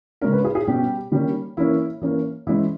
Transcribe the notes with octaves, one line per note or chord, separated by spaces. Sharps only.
C#3 G#3 C#4 A#4
B4
G#4
G#4
B2 G3 C#4 G4
D#3 G3 A#3 C#4
E3 A#3 C#4 E4
E3 A#3 C#4
E3 G#3 C#4 E4